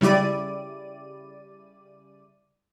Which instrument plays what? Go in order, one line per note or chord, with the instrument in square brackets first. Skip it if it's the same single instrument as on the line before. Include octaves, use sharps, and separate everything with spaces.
[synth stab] C#3 G3 E4 D5 D#7